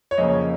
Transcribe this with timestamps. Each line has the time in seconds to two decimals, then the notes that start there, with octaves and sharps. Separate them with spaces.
0.11 C#5
0.18 F2 C#3 F3 A#3 D#5